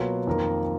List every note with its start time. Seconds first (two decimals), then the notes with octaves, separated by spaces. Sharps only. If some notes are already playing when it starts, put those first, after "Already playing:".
Already playing: B2 F#3 A#3 F4 B4
0.27 F2 D#3 A#3 F4 A#4